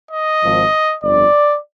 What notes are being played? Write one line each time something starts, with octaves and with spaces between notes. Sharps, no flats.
D#5
G#1 G#2 F3
G1 F2 D3 D5